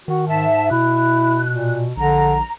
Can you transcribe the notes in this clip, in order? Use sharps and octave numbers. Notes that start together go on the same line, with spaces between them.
D#3 F#4
G#2 E5 A5
B2 E4 F#6
A#2
A#1 D3 A#5